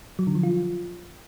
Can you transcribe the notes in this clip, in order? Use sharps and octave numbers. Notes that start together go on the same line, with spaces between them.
F#3
D3
F3
F4